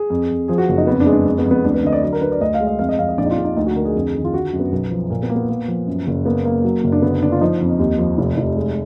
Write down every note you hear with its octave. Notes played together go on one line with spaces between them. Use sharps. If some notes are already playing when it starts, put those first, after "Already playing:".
Already playing: G#4
F2
F2
F3 G#4
F#4
F#1
D#4
F2 B3
D4
G#3
D4
F2
B3
F2
B3
D2 D4
B4
D3 D#5
D5
F#3 D5
A#4
D3 B4
D5
D2 D#5
F5
G#3
D#5
F2 F5
D#5
F2 F5
D#5
A#1 D5
D#4
F4
A#1
D#4
D2 D#4
F#4
D3 A#4
G#4
F2
D#3
F4
D3 F#4
F#2
B3
B1
F3
A#2 A#3
B3
A#3
B3
A#3
F3
F#2
F#1
A#3 B3
A#3
F#3
F#1
D4
D3 B3
D3 D4
F4
F3 D#4
F2
D#2
F3
F1
F1
G#3